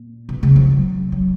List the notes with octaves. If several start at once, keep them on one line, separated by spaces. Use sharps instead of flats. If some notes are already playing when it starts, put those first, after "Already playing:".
Already playing: A#2
B2
C#3
F3
F#3
F#3